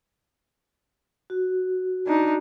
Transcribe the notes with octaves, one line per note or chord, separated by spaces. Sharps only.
F#4
D4 D#4